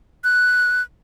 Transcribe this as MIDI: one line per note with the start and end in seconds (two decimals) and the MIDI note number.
0.24 0.82 90